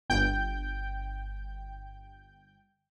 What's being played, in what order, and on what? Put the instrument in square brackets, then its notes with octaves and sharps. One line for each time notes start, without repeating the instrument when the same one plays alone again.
[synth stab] G1 G5 G6